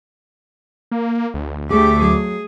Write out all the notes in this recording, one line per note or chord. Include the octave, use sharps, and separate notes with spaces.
A#3
D2
A3 G4 G#4 D6
F#3 G#4